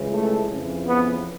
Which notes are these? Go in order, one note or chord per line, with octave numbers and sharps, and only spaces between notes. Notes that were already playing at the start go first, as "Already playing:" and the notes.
Already playing: C#2 C#3 E3
A3
F2 C#3 E3
B3